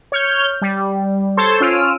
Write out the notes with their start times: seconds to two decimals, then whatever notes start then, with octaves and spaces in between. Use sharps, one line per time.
0.12 C#5 F6 G6
0.61 G3
1.37 A4 C5 C#5 A5 C6
1.60 C#4 F4 E6 F6 D7 D#7